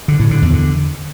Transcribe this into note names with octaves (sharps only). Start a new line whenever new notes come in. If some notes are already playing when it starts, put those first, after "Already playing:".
D3
A2
D3
E2
D3